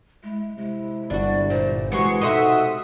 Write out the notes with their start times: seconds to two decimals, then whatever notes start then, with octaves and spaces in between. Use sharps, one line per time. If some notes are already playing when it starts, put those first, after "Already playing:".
0.24 G#3 E4
0.57 C3 G#3 E4
1.10 G1 D4 F#4 D5
1.50 A#2 C5
1.92 C3 E3 G#3 F#4 F#5 C#6 C7 C#7
2.21 B2 D#4 A4 C5 E5 F#5 D#6